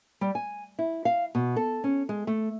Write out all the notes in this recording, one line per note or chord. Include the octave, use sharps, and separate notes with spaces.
G3
G#5
E4
F5
B2
A4
C#4
G#3
A3